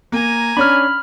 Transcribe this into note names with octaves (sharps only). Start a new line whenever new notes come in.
A#3 G#5 A#5
C#4 D4 B5 F6